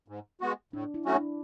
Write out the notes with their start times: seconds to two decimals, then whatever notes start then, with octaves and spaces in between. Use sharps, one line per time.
0.08 G#2
0.41 G#3 B3 F#4
0.73 A2 D4
0.94 E4
1.05 F#3 A3 C#4 F#4
1.15 D4